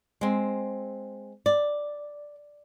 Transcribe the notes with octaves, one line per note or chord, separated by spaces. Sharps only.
G#3 C4
D5